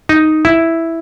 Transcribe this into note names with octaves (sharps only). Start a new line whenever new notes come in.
D#4
E4